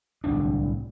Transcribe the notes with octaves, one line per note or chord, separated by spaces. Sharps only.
D1 C2 D4